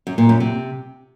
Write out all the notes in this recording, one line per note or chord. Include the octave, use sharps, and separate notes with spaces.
F#2
A#2
F#2
C3